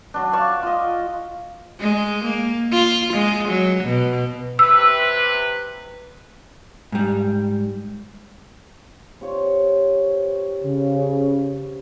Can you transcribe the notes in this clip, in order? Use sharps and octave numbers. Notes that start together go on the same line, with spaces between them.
F#3 D4
D5 F5 A5 C#6
F4 D#5
G#3
A#3
F4
G#3
F#3
B2
C3 B4 E6
G#2 G3
C3 F4 C#5
C#3